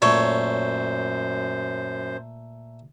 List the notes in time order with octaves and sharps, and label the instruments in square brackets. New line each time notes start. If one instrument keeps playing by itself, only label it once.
[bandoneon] F#2 C5 [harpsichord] A#2 A3 [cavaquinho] C#5